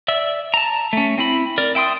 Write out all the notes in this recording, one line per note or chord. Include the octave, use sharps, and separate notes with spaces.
D5 E5 E6
A5 A#5
A3 C#4
C4 E4 B5
A#4 D5
E5 G5 C6 D#6